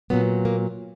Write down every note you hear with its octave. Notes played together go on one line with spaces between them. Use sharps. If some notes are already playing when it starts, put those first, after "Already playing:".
A#2 F#3 B3
A#3